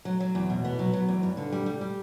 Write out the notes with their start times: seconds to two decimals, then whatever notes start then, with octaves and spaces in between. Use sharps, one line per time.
0.05 F#3
0.20 F#3
0.35 E2
0.50 B2
0.65 B3
0.79 F#3
0.93 F#3
1.08 E2
1.23 G2
1.37 D3
1.52 G3
1.66 G3
1.81 G3